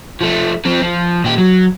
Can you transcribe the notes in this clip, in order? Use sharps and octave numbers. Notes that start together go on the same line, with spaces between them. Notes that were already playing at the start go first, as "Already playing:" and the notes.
F3 A3
F3 C4
F3
A#2 G4
F#3